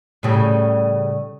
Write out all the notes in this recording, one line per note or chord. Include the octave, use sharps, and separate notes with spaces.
A2 C#3 G3